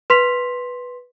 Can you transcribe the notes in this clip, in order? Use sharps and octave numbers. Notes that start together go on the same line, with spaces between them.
B4 C6 B6 F7